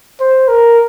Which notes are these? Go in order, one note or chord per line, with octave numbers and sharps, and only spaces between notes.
C5
A#4